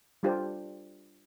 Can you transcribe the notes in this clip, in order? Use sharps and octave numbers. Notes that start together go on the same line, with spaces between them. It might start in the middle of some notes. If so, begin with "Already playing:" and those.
G3 D4 F4 G4 A4 C5